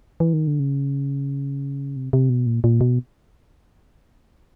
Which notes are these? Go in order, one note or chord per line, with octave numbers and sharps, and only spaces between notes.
E3
D#3
D3
C#3
C3
C3
B2
A#2
A#2
B2